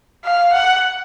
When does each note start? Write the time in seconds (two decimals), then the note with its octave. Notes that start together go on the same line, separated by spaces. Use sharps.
0.25 F5
0.53 F#5